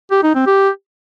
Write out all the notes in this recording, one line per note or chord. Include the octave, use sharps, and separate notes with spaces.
G4
D#4
C4
G4